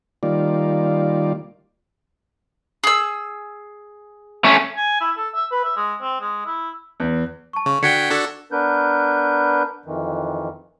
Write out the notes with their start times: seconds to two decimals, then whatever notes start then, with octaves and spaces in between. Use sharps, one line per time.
0.23 D#3 G3 A#3 F4 D5
2.84 G#4 E6
4.45 A3 C#4
4.77 G#5
5.01 E4
5.17 A4
5.35 E5
5.52 B4
5.64 E5
5.77 G#3
6.02 C4
6.21 G#3
6.46 E4
7.00 E2
7.53 A5 C#6
7.66 C#3 C#6
7.83 D3 F#4 G5 G#6 B6 C#7
8.10 D4 F#4 A4
8.52 B3 D4 A#4 B4 G6
9.85 F2 D#3 E3